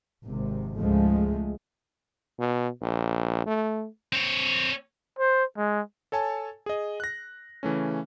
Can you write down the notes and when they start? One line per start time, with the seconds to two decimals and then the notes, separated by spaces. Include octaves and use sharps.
0.24 G#1 C3
0.77 C#2 G#2 F3 G#3 A3
2.40 B2
2.81 A#1
3.46 A3
4.13 C4 C#5
5.19 C5
5.57 G#3
6.12 A4 C#5 G#5 A5
6.66 G#4 D#5
7.00 F#6 A#6
7.63 C#3 E3 A3 C#4